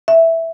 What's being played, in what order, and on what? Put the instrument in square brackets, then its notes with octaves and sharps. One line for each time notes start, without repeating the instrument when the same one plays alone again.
[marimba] E5